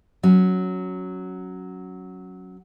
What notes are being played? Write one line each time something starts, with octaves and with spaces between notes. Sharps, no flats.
F#3 C#4